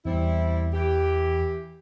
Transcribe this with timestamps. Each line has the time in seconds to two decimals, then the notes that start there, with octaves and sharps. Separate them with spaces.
0.05 E2 G3 C4 E4
0.72 E3 G4